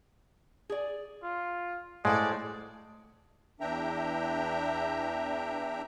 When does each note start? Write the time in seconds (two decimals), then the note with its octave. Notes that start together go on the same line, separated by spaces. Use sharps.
0.70 G#4 D5
1.22 F4
2.05 A2 G#3 C5 D5 F5 F#5
3.60 E2 E3 D4 E5 G5 A#5